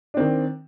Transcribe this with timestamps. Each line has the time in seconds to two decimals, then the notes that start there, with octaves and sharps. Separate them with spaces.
0.14 D4
0.17 C4
0.20 D#3